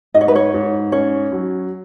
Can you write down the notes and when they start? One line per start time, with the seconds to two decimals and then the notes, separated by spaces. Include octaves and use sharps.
0.14 G#2 D#5
0.21 C#5
0.28 B4
0.35 C#5
0.54 G#2
0.92 C#4 C#5
1.32 F#3